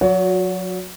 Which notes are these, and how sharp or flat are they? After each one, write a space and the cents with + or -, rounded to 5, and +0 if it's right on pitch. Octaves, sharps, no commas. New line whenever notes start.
F#3 -25 F#4 -15 C#5 +35